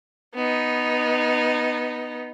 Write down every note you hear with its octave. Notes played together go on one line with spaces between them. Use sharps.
B3 D#4